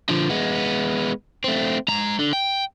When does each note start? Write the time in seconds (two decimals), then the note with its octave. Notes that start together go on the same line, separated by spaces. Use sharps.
0.09 D3 F3
0.29 G#3 B3
1.44 A3 C4
1.88 G#3 A#5
2.19 D3
2.33 G5